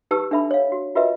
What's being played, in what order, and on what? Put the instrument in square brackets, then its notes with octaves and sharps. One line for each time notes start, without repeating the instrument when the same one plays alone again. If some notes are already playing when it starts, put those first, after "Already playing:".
[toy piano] D#4 G4 B4 A5 C#6 E6
D4 A4 B4 E5 A5 B5
C#5 F5
F#4
F4 F#4 A#4 B4 D#5 E5